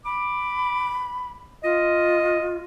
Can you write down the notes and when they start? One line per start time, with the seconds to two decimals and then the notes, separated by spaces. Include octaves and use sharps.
0.05 B5 D6
1.64 F4 D#5